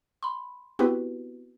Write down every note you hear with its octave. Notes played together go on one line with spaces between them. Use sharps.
B5 C6
B3 C4 E4 F#4 G4 B4